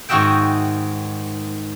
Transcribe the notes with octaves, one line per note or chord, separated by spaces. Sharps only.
G#2 D#3 F#4 D#5 E5 G5